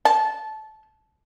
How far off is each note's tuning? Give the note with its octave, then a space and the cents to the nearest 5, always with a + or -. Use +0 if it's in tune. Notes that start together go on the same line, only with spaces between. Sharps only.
A5 -20